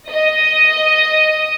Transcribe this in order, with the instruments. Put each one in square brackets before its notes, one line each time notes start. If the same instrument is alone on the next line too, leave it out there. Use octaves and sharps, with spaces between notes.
[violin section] D#5